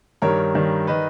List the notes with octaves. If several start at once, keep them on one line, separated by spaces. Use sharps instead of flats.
G2 D#3 G3 A#4 C#5
G2 D#3 G3
D#3 G3 B4 D#5